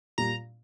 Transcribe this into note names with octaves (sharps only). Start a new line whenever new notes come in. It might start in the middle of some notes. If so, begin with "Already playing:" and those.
A#2 G3 A#5